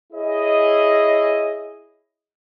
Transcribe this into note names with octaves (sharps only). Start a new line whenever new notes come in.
E4 G#4 C#5 D#5